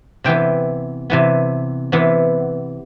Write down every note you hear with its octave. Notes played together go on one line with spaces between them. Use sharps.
C3 E3 B3 G5
C3 E3 B3
C3 E3 B3